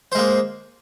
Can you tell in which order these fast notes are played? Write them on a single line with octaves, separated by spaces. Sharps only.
C5 G#3 A#3